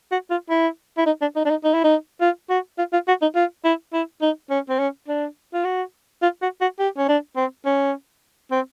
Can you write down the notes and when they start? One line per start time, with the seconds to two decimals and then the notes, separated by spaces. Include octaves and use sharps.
0.12 F#4
0.31 F4
0.50 E4
0.97 E4
1.06 D#4
1.21 D4
1.36 D#4
1.45 D4
1.50 D#4
1.64 D#4
1.74 E4
1.84 D#4
2.21 F4
2.50 F#4
2.78 F4
2.93 F4
3.08 F#4
3.22 D#4
3.36 F4
3.64 E4
3.93 E4
4.21 D#4
4.50 C#4
4.70 C4
4.79 C#4
5.08 D4
5.54 F4
5.65 F#4
6.22 F4
6.42 F#4
6.61 F#4
6.79 G4
6.97 C#4
7.08 D4
7.36 C4
7.66 C#4
8.51 C4